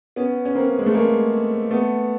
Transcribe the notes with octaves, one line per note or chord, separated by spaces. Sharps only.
B3 C#4
C#4
A#3 C4
G#3
A3
G#3 A#3
A3 B3